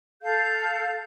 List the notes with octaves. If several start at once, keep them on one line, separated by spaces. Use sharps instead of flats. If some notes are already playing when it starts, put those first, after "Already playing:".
A4 F5 G6